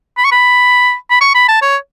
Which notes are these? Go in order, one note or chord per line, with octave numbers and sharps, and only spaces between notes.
B5
C#6
B5
B5
C#6
B5
A5
C#5